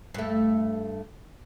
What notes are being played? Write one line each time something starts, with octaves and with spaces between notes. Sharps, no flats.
G2 A3